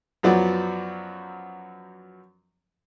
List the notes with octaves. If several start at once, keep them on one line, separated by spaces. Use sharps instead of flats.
F#2 F3 F#3 B3 D5